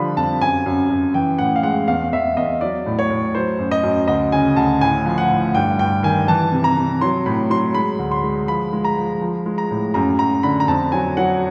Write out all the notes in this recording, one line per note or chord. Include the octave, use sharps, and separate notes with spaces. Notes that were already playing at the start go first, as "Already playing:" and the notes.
Already playing: D3 F3 G3 B5
F2 A5
F#2 G#5
F#2
F#2
E3 G5
A2 F#5
F5
G#3 F#5
E2 F5
E2 E5
E2 D#5
F#3 D5
A2
C#5
A2
F#3 C5
F#2
D#5
F#2
D2 D#5
C#3 G#5
D2 A5
A2 G#5
F3
F#5
A2
G2 G5
G2 G5
D#3 G#5
E3 A5
C3
A#5
C3
F#3 C6
A2 B5
F#3 C6
G#3 B5
D2
C6
G#3
F3 B5
G#3
A#5
F3
F3
G#3
A#5
A2
F#2 A#5
F#2 A#5
D3 B5
A#5
F2 A5
F#3 G#5
F#3 F#5